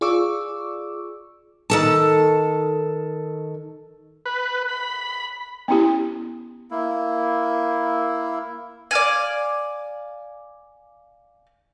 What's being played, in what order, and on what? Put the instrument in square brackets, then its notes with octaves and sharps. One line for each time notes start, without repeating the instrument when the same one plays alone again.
[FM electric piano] F4 G#4 D5 C#6 D6 E6
[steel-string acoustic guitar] D#3 A4 A5
[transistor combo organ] B4
B5
[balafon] B3 C#4 E4 G4
[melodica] A#3 E4
[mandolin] D5 F5 G#5